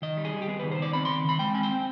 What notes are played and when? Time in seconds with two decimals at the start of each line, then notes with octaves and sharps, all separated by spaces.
0.02 D#3 D#5
0.17 G3
0.25 G#4
0.34 G3
0.42 G4
0.48 B3 G#4
0.60 D#3 B4
0.71 C5
0.79 D#3 D5
0.93 C4 B5
1.05 D#3 C6
1.25 D#3 B5
1.39 G#3 G5
1.54 C4 G#5
1.63 G5
1.71 C4